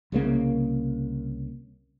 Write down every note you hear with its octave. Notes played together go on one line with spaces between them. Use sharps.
C2 C#3 F#3 A#3